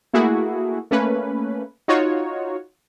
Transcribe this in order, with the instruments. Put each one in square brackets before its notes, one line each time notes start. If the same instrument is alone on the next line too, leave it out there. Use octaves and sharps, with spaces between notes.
[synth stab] A3 A#3 E4 F#4 G#4
A3 A#3 C#4 B4
D#4 F4 F#4 C#5